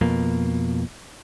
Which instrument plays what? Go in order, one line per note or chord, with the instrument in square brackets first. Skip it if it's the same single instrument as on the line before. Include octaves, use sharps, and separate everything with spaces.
[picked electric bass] F2 B2 A#3